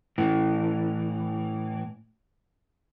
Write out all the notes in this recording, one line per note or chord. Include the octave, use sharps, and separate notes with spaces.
A2 E3